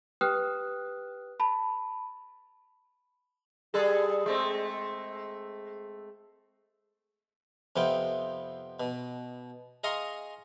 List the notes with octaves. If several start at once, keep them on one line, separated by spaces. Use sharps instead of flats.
G4 B4 G5 D#6 F6 F#6
A5 B5
G3 G#4 A4
G#3 A3 C4
F2 C3 B3 F4 G5
B2
G#4 D#5 F5 A#5 C6 C#6